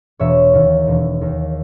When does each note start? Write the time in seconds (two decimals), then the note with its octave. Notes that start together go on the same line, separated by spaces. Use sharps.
0.20 E1 C#5 E5
0.53 D#2 D#3
0.87 E1
1.21 D#2 D#3